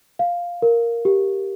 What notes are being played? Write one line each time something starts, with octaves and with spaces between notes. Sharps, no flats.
F5
A#4
G4